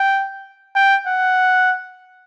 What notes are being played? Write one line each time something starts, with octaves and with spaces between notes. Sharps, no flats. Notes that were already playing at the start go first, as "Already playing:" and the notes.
Already playing: G5
G5
F#5